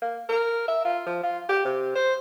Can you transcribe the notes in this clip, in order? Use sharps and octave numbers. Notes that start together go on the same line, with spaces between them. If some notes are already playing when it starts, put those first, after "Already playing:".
A#3
A#4
E5
F4
F3
F4
G4
C3
C5